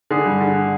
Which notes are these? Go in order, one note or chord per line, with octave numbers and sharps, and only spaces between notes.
D3 G#4
G2
D3